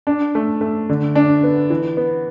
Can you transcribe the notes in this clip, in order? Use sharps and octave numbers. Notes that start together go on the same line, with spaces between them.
D4
A3
A3
D3
D4
B3
E3
B3